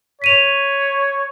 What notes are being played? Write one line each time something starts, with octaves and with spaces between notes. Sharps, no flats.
C#5 B6 D#7 F7